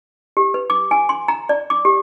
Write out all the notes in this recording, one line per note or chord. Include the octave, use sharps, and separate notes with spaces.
G4
B4
D6
G#5
C6
A#5
D5
D6
G4